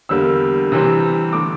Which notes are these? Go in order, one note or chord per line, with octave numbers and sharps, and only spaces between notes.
E2 D3 G3 A#3 E6
C3 E3 G3 C4
D3 A3 D6